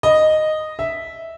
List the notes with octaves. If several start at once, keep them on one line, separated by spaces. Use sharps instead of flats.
D#5
E5